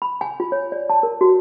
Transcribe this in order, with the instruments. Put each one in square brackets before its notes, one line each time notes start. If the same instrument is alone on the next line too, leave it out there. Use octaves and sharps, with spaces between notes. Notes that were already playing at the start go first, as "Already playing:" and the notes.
[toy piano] B5
G#5
F4
C#5
D5
A5
A#4
F#4